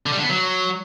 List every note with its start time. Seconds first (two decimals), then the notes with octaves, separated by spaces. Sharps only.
0.06 D3
0.12 G3
0.18 D3
0.24 B3
0.29 F#3